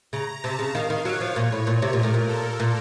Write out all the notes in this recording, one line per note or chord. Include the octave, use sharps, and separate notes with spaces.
C#3 A#5
C3 A5
C#3
D#3 F5
D#3
F#3 C#5
F3
A#2
A2
A#2
C3
A#2
A#4
A2
A#2
A4
A#2